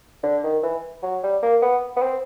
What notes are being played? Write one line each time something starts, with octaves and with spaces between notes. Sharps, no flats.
D3
D#3
E3
F#3
G3
A#3
B3
B3
C4